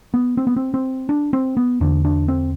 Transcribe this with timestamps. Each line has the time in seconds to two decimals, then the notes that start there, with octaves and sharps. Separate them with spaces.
0.14 B3
0.37 C4
0.47 B3
0.56 C4
0.74 C4
1.09 D4
1.33 C4
1.57 B3
1.81 E2 D3 D4
2.05 D4
2.28 C4